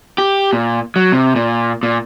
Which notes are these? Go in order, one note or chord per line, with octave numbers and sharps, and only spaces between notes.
G4
A#2
F#3
C3
A#2
A#2